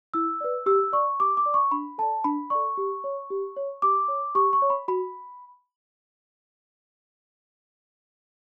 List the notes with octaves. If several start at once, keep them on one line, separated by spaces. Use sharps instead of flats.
E4 E6
B4 D5
G4 E6
D5 C#6
G4 D6
D6
D5
C#6
D4 B5
A4 D5 A5
D4 B5
A4 D5 C#6
G4
C#5
G4
C#5
G4 D6
C#5
G4 C#6
C#6
C#5
B5
F#4 B5